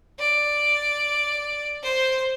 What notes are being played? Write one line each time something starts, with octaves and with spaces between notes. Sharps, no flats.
D5
C5